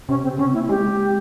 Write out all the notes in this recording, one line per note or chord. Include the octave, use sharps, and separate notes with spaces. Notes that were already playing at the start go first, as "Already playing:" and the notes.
C3 C#4
C#3 C4
C4 C#4
A#3 E4
G#3 G4